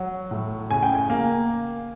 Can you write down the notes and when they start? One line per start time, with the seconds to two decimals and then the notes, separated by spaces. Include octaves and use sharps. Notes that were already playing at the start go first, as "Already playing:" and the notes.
Already playing: F#3
0.31 A2
0.71 C#3 G#5
0.83 G5
0.95 G#5
1.10 A#3